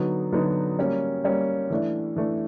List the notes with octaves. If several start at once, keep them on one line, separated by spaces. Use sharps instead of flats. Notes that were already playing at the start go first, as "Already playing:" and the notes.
Already playing: D3 F#3 B3 D#4 F#4
D3 F#3 B3 D#4 F#4
G3 A#3 C#4
G3 A#3 C#4
E3 A3 D4
E3 A3 D4